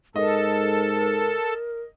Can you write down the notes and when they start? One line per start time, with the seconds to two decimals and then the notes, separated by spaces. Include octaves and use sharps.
0.16 G#2 A4 A#4 D#5